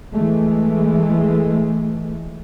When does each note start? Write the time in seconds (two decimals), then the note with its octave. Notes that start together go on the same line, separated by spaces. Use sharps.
0.13 E3 G#3 A3